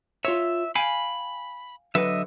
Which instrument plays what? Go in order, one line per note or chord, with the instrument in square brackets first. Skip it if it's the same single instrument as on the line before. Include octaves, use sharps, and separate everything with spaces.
[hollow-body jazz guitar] F4 C#5 [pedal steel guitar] E5
[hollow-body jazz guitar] F5 G5 G#5 [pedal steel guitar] B5
[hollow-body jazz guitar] D3 F#3 B4 [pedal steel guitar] D#5 E5